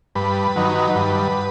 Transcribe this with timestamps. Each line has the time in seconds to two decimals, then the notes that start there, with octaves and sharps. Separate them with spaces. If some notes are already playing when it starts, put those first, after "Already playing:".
0.15 G2 B4
0.56 D#3 F#3
0.96 G2